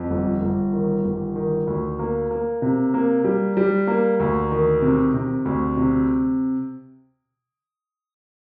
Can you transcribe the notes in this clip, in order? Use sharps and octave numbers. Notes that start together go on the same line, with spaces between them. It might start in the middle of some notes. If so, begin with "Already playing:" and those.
Already playing: F2
G1
G1
D#3
G1
D#3
D2
A#3
A#3
C3
A#3
G3
G3
A#3
D2
D#3
C3
C3
D2
C3